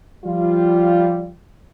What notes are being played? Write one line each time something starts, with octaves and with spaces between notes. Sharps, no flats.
F3 G3 F4